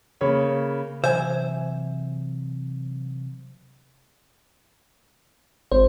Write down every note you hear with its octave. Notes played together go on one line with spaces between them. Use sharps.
C#3 A#3 C#5 B5
C3 E3 F#3 C5 E5 G#5
G#1 C5